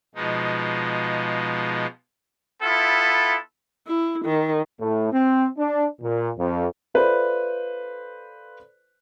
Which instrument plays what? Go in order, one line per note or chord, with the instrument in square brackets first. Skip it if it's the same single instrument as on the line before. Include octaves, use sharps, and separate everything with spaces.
[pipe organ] B2 F3 G#3 D#4
[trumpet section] B3 E4 F4 A4
[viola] E4
D#3
[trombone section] A2
C4
D4
A#2
F2
[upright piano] F4 A4 B4 C5 D5 E5